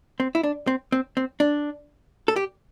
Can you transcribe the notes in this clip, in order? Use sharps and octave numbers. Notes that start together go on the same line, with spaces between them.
C4
E4
D4
C4
C4
C4
D4
A4
G4